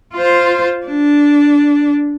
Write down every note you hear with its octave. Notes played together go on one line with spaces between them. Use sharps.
F4 C5
D4